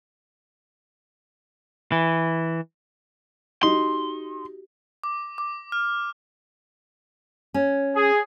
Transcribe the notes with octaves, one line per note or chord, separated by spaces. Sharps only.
E3
D#4 F#4 G4 C6
D6
D6
F6
C#4
G#4